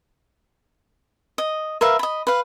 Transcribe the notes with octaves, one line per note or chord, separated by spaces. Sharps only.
D#5
A#4 B4 E5 F5
D#5 B5
B4 F5